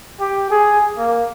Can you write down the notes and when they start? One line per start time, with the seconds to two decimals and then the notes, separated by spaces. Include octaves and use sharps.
0.20 G4
0.51 G#4
0.97 A#3